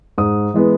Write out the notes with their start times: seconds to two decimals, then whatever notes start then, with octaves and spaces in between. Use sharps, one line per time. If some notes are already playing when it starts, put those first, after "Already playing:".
0.18 G#2 D#6
0.54 E3 G#3 B3